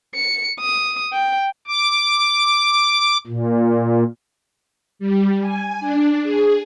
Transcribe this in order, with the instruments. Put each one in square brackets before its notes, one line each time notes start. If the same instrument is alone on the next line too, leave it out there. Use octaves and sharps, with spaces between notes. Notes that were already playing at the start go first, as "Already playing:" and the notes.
[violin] C#7
D#6
G5
[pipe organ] D6
A#2
[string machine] G3
G#5
D4
G#4